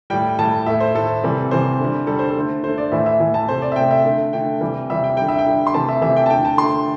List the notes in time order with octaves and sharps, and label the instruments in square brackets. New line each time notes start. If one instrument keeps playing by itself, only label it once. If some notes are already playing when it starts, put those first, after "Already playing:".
[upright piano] A2 G3 G5
A2 G3 A5
A2 A3 E5
C5
A2 A3 A4
C3 E3 G3
C3 E3 G3 C5
D3 G3
G3 A4
D3
C5
A4
D3 A3
D3 A3 C5
D5
A2 E3 A3 E5
E5
A2 E3 A3
A5
C3 A3 C5
D5
E5
C3 A3 G5
E5
D3 A3
D3 A3 G5
C3 E3 G3
C3 E3 G3 E5
G5
D3 G3 G5
E5
G5
D3 G3
C6
C3 E3 A3 A5
E5
C3 E3 A3 E5
G5
A5
D3 A3 G5
A5
D3 A3 C6